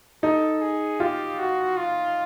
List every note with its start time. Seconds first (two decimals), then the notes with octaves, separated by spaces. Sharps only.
0.23 D#4 A4
0.62 G#4
1.00 F4 G4
1.39 F#4
1.77 F4